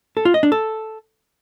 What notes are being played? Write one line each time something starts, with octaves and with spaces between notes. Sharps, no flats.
A4
F4
D#5
D4
A4